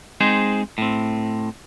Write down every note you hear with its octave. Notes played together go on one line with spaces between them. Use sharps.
G#3 C4 D#4 G#4 C5
A2 C4